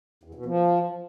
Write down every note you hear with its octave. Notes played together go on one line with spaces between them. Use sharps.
E2
B2
F3